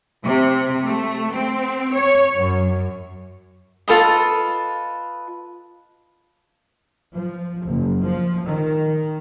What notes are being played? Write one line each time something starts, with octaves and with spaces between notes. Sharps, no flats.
C3
A3
C4
C#5
F#2
F4 A4 B4 D#5
F3
F#1
F3
D#3